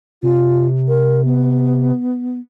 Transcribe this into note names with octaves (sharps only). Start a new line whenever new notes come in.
C3 F4
A#4
B3